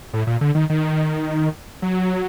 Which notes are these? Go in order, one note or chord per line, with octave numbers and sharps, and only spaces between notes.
A2
A#2
D3
D#3
D#3
F#3